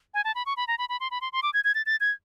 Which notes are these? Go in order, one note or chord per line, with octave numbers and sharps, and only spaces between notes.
G#5
A5
B5
C#6
B5
A#5
B5
B5
C6
B5
C6
C6
D6
G#6
G#6
A6
A6
G#6